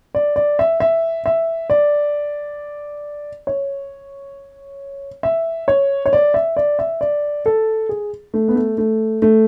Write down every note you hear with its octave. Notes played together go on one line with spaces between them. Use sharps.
D5
D5
E5
E5
E5
D5
C#5
E5
C#5
C#5
D5
E5
D5
E5
D5
A4
G#4
A3
B3
A3
A3
A3